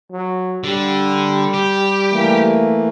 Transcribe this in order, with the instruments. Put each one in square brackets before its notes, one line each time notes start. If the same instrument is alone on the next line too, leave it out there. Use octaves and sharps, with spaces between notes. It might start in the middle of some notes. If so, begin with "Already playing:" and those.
[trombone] F#3
[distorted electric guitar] D3 [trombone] G3
[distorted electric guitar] G4
[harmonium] E3 A3 A#3